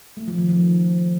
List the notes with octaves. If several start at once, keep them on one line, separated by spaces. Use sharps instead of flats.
A3
F3
D#3
F3